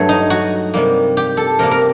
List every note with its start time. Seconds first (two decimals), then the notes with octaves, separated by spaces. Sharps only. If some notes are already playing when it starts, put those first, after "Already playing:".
Already playing: G2 F#3 A3
0.09 D#4
0.30 F#4
0.74 C3 G3 A#3
1.17 G4
1.37 A4
1.59 C3 G3 A#3 A#4
1.71 A#4